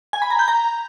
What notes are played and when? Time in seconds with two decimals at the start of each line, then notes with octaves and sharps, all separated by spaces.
0.13 G#5
0.22 B5
0.30 A#5
0.39 G6
0.48 A#5